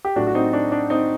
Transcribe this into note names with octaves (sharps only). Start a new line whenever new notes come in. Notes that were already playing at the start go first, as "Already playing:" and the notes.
G4
A2 F#3 D4 F#4
F#4
C4 D#4
D4
D4
C4 D#4